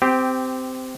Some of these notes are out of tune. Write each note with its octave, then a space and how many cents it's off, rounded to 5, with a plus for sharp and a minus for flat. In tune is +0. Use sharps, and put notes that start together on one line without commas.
C4 -20 G4 +0